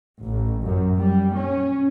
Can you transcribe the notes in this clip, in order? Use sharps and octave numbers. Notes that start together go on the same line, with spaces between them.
A1
F#2
G3
C#4